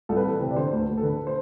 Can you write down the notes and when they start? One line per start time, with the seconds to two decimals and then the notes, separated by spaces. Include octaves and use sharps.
0.09 C2 A4
0.16 B4
0.24 E3 A4
0.33 B4
0.41 C3
0.51 D5
0.56 D3 C5
0.72 D2
0.80 B4
0.88 D2
0.97 A4
1.03 D3 B4
1.27 C5